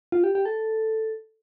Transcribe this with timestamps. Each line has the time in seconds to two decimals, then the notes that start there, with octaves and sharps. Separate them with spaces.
0.12 F4
0.24 G4
0.35 G4
0.45 A4